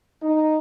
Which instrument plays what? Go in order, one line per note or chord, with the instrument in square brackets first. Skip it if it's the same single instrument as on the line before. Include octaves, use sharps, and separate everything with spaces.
[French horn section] D#4